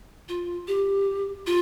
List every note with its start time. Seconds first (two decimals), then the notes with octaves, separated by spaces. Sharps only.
0.29 F4
0.67 G4
1.46 F4